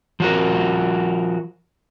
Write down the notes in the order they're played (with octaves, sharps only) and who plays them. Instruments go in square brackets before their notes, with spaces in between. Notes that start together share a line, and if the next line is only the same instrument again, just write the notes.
[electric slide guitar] F3 F#4 A#4